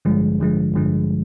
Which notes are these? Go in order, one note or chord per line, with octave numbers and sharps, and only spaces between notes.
A1 G2 D3 F3 G#3
A1 G2 D3 F3 G#3
A1 G2 D3 F3 G#3